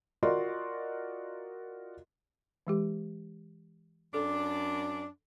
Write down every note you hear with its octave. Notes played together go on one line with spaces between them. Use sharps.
F4 F#4 A#4 D5 D#5 C6
E3 G#3 G4
F#2 D4 A4